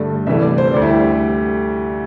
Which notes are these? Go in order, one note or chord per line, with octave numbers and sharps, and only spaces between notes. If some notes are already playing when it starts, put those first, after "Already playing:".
Already playing: G2 D3 A3
C2 C3 E3 A3 E5
D5
C5
D2 D3 G3 D5
E4
G4